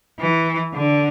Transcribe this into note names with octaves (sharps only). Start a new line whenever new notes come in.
E3
D3